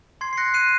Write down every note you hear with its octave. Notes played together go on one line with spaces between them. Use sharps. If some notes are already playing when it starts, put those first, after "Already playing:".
C6 G#6 C7
C7
F#6 A#6 C#7
F#6 C7 D#7